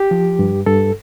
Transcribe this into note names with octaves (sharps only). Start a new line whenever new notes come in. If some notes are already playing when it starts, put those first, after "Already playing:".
Already playing: G4
F3
G2
G2 A4